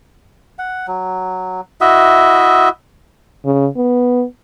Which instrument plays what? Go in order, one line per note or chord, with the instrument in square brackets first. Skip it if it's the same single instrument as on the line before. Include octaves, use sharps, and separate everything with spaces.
[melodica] F#5
F#3
E4 F#4 D#5 E5
[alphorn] C#3
B3